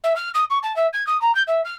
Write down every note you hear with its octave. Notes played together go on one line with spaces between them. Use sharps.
E5
F6
D#6
C#6
A5
E5
G#6
D#6
A#5
G6
E5
F6